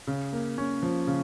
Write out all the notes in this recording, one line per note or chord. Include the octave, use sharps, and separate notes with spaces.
C#3
A#3
C#4
F3
C#3